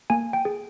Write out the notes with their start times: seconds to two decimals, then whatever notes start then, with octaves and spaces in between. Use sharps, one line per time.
0.10 A#3 G#5
0.33 G5
0.45 G#4